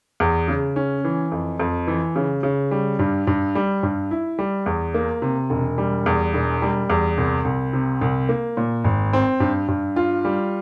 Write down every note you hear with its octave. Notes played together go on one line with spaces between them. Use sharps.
E2
C#3
C#4
E3
F2
F2
E3
C#3
C#3
G3
G2
G2
G3
G2
E4
G3
E2
A#3
C3
E1
G3
E2
E1
G3
E2
C2
C2
C3
C2
A#3
A#2
G#1
C4
G2
G2
F4
G3